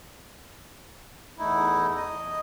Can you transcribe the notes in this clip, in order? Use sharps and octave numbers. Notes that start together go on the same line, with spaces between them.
E2 A3 D#4 E4
D#5